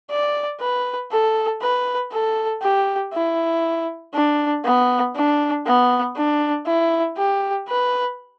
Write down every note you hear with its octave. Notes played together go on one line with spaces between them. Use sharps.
D5
B4
A4
B4
A4
G4
E4
D4
B3
D4
B3
D4
E4
G4
B4